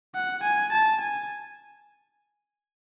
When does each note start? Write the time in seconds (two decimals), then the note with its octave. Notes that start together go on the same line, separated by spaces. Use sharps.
0.15 F#5
0.44 G#5
0.73 A5
1.01 G#5